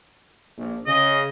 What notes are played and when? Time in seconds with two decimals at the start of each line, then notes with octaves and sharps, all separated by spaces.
0.57 A#1
0.87 C#3 D#5